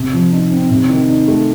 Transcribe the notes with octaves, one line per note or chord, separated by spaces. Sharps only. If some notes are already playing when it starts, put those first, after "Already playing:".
Already playing: C3
F3
D#4
C4
C3
D#3
D#4
A3